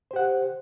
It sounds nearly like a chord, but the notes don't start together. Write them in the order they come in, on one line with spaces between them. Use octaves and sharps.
C5 G4 F#5